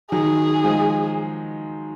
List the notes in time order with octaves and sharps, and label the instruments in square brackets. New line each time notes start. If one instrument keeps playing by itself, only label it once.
[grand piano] D#3 F#3 [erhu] G#4
[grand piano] F3 G#3